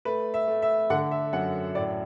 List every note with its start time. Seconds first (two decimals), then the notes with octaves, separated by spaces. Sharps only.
0.05 A3 B4
0.34 E5
0.47 A3
0.62 E5
0.90 D3 F#5
1.11 E5
1.33 F#2 F#5
1.75 A2 D5